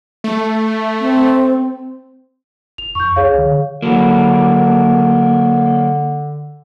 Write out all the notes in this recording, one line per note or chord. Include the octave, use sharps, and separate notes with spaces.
A3
C4
F1 F7
F2 C#6 G6
C#2 G#4 C#5 F5
D3
D3 F#3 A#3